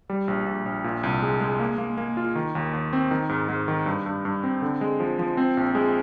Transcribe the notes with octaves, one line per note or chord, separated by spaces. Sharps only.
G3
A#1
A#1
A#1
A#2
C2
G#3
G#3
A#3
A#3
A#3
F4
D#3
D#2
D#2
C4
D#3
G#2
G#2
D#3
G2
G2
G2
C4
D3
G#3
F3
F3
C4
A#1
G#3